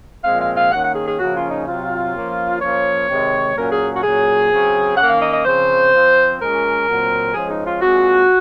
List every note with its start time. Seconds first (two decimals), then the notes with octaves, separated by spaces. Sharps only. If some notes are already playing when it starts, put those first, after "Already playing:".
0.24 A#2 F3 G#3 C4 F5
0.40 F5
0.55 F5
0.72 D#3 A#3 C#4 F#5
0.84 F#5
0.95 G#4
1.07 G#4
1.19 C#3 F3 A#3 C#4 F#4
1.35 F4
1.51 D#4
1.66 C3 F#3 C4 F4
2.14 F3 A#3 C#4
2.61 F3 A#3 C#4 C#5
3.08 C3 D#3 G#3 C4
3.55 A#2 F#3 A#3 C#4 A#4
3.71 G#4
3.95 F#4
4.02 A#2 F#3 C#4 G#4
4.50 C#3 F#3 C4
4.97 D#3 A#3 C#4 F#5
5.09 F5
5.22 D#5
5.32 D#5
5.45 C#3 F3 C4 C5
5.92 F3 C4
6.39 A#2 G#3 C#4 A#4
6.86 A#2 F#3 C4
7.33 F3 G#3 C#4 G#4
7.49 D#4
7.65 F4
7.81 A#2 G#3 C4 F#4